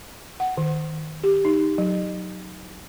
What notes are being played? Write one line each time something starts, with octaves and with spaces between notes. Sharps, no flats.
F#5
D#3
G4
D#4
F#3